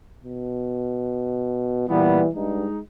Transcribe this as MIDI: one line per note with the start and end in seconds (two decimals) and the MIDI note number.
0.23 1.88 47
1.89 2.22 46
1.89 2.29 52
1.89 2.22 55
1.89 2.22 59
2.35 2.67 43
2.35 2.79 56
2.35 2.79 63